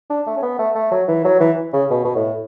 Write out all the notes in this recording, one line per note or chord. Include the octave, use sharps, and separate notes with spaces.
D4
A3
C#4
B3
A3
A3
F#3
E3
F#3
E3
C#3
B2
B2
A2